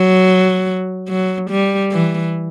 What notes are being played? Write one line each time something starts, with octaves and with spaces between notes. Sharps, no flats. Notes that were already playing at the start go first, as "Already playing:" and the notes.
Already playing: F#3
F#3
G3
E3